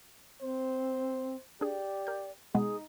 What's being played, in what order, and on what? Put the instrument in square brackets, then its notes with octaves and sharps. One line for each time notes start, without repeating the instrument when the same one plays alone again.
[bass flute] C4 [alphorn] C5
[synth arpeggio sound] D4 G#4 [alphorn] G4 [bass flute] D5
[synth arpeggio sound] A#4 G6
[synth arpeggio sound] B2 G#3 B3 [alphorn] D#4 [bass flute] G#4